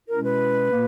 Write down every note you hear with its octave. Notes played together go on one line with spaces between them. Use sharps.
B2 G#3 C#4 E4 A#4
B4
A#2 A#3